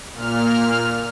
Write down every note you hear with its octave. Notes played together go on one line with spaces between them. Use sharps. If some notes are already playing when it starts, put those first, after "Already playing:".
A#2 F6